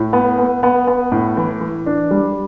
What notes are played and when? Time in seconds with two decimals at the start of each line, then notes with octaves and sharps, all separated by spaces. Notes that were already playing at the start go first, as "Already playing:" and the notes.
Already playing: A2
0.13 B3
0.38 B3
0.63 B3
0.87 B3
1.12 A2
1.37 E3
1.61 E3
1.86 D4
2.11 G3